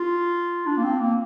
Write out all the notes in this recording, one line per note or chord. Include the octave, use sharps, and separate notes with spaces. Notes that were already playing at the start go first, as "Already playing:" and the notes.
Already playing: F4
D4
A#3
C4
A#3